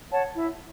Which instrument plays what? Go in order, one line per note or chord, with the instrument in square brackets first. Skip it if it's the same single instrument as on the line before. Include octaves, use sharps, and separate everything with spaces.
[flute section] C#5 F#5 A5
E4